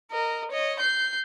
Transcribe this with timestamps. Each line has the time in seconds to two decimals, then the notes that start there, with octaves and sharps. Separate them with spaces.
0.11 A#4 D#5
0.51 C#5 D#5
0.79 G6 C7